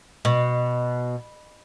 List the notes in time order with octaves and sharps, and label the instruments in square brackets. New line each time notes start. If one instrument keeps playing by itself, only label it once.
[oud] B2